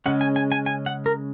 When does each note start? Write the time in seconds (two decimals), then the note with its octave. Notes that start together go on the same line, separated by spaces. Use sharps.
0.06 C#3 G#3 C#4 F#5
0.21 G#5
0.36 G#5
0.52 G#5
0.66 G#5
0.86 F#5
1.06 A#4